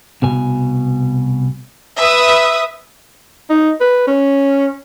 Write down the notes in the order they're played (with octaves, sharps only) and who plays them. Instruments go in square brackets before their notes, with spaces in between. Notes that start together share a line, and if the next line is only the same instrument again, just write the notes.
[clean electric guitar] C2 B2 G#5
[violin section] B4 E5 D#6
[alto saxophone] D#4
B4
C#4